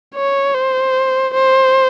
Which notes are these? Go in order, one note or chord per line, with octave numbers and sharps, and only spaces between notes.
C#5
C5
C5